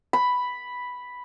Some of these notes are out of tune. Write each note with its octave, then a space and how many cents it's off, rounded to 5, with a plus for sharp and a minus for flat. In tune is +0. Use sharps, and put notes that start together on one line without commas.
B5 +0